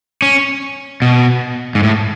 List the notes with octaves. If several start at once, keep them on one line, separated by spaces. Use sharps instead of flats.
C#4
B2
G#2
A2